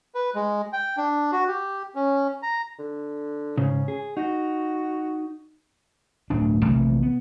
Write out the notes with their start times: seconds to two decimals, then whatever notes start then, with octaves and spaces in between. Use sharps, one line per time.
0.15 B4
0.35 G#3
0.73 G5
0.97 D4
1.32 F#4
1.48 G4
1.95 C#4
2.43 A#5
2.79 D3
3.58 G#2 C#3 C#4
3.88 G#4
4.17 D#4 F#4
6.30 D1 G1 D2 D4
6.63 A#1 C3 E3 A3
7.02 B3